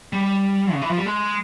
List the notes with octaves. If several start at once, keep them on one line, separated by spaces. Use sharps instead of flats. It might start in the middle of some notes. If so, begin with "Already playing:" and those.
G3
C#3
E3
F3
G3
G#3